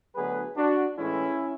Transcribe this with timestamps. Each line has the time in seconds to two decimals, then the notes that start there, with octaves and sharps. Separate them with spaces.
0.15 D2 D3 F#3 B3 G#4 B4
0.56 D4 F#4
0.97 A2 E3 G#3 C#4 E4